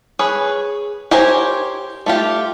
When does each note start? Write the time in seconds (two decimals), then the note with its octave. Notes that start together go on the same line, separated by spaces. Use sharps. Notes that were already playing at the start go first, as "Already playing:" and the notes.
0.19 G#4 B4 C#5
1.11 G4 A#4 C5 C#5 G#5
2.06 A3 F4 G4